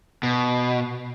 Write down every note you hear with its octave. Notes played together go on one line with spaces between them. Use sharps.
B2